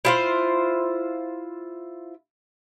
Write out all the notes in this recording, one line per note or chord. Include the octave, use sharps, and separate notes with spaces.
E4 F4 C5